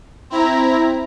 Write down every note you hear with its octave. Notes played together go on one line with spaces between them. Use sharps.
C4 E4 A#5